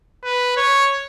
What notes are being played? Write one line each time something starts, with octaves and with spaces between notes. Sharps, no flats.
B4
C#5